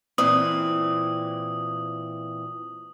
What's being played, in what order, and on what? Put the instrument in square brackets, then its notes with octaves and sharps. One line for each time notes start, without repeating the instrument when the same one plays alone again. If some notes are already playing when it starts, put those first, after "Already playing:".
[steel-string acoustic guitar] A#2 E3 C4 [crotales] D#6